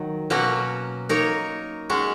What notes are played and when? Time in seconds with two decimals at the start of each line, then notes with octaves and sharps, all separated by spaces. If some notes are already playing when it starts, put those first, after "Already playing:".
Already playing: D#3 F#3
0.30 B2 F#3 A#3 C#4 F#4
1.09 A#3 D#4 A#4 C#5
1.90 G#3 C#4 F#4